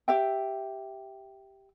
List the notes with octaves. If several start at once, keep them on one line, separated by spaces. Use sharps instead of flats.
G4 E5 G5